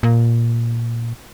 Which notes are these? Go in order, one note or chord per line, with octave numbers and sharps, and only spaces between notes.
A#2